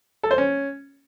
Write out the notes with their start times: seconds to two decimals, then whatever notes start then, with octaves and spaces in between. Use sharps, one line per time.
0.23 A4
0.31 C5
0.38 C#4